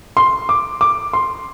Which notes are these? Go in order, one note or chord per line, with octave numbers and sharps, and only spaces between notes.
C6
D6
D6
C6